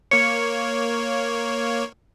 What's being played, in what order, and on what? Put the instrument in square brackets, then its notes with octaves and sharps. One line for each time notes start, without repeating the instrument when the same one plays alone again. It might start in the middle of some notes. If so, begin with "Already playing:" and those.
[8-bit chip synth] A#3 C#5 [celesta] C#7